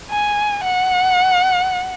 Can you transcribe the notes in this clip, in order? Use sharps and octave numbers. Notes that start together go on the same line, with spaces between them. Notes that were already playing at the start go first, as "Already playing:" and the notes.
G#5
F#5